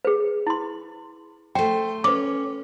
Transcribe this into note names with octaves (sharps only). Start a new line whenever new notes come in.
G#4 B4
E4 C6
A3 C5 G5
C#4 B4 D6